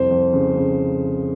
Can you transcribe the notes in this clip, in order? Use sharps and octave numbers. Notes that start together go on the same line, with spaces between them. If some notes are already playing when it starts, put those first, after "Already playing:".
Already playing: C2 F2 C5
F2
C#3
C#3